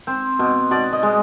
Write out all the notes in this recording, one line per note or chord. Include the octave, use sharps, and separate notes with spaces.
C4 C5
B2
B2 D5
D#5
G#3